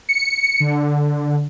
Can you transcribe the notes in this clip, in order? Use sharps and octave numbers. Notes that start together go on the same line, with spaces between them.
C#7
D3